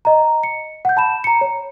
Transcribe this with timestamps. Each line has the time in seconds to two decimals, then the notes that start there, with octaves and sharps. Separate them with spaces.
0.05 D#5 A#5
0.43 C#7
0.85 F#5 G6
0.97 A5 B5 E7
1.24 A#5 C#7
1.41 C#5